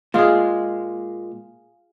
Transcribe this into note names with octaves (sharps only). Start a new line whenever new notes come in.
A#2 G#3 F4 G#4